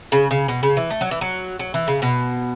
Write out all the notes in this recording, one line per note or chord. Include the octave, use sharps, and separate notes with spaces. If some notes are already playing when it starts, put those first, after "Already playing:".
C#3
C#3
B2
C#3
E3
A3
F#3
E3
F#3
F#3
E3
C#3
B2